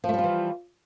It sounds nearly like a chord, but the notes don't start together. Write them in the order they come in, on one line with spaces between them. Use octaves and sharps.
F3 A3 G3 F4 E3